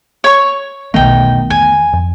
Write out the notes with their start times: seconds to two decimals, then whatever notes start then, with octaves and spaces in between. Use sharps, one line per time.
0.24 C#5 C#6
0.94 B1 E2 D#3 A3 B3 D#4 G5
1.50 E2 G#5
1.93 F2